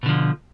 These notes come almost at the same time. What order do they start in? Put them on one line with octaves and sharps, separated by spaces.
B2 D3 F3